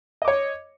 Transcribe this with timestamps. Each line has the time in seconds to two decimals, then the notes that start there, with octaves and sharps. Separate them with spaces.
0.22 D#5
0.25 D6
0.28 C#5